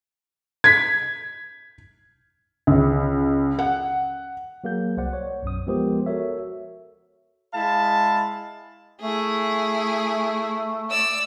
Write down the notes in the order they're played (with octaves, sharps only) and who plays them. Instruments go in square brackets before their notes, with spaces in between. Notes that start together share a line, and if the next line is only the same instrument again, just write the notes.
[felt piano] G#6 B6
C#2
F#5
[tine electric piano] F#3 A#3 G#4 G6
C2 C5 D5 F#5
C#5
B1 F#2 D#6
F3 G#3 B3 G4 A#4 C5
F#4 A4 A#4 C#5 E5
[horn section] G#3 E4 F5 A5
[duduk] A3 [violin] E4 G#4
[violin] D5 E6